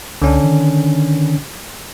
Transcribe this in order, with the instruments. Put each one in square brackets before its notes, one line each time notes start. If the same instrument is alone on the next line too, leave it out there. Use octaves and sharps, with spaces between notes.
[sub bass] C#2 [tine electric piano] D3 C#4 D4
[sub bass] D#3